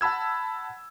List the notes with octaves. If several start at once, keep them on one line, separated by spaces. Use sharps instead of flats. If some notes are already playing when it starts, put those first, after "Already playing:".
F#5 A5 B5 E6 G#6